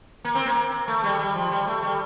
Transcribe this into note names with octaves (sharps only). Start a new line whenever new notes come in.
A#3
C4
A#3
A3
G3
G3
F3
G3
A3
G3